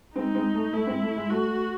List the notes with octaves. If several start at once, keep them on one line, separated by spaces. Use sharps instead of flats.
G#3 C4 D#4
G#3 C4
A3
A3 E4
G#3 C4
A3
G#3
A3 F#4